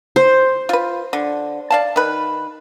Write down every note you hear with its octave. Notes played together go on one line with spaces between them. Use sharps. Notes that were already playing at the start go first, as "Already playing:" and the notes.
C5
F4 B4
D3
D5 F5 A5
D#3 B4